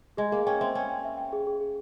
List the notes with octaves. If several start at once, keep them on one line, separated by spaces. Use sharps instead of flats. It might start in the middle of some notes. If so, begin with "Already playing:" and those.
G#3 G#4
A#3 G#4
C#4 G5
C4 E5
C#4 G5
G5
E5
G5
G#4
G#4
G#4